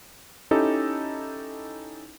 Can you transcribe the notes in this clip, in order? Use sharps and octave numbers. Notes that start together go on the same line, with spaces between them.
C#4 D#4 E4 G4 A4 D#5